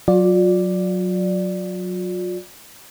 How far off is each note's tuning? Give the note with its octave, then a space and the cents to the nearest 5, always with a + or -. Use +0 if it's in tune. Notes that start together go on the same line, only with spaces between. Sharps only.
F#3 -10 F4 +45 D5 +0